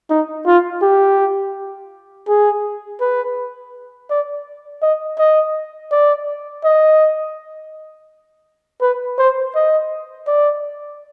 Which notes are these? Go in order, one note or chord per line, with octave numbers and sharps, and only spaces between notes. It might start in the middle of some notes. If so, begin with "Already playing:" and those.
D#4
F4
G4
G#4
B4
D5
D#5
D#5
D5
D#5
B4
C5
D#5
D5